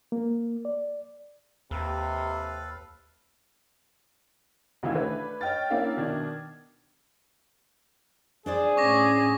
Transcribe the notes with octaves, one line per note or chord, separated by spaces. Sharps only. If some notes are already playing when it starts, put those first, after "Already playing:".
A#3
D5
D#2 C3 A4 B4 F5
D2 D#3 E3 F5 E6 G#6
A3 D4 B4
C#5 D#5 G5 F6 A6
A#3 C#4 D4 E4 E5 F5
B2 D#3 D4 G#6
D4 G#4 C5 D5
A2 C#4 C#6 D6 A#6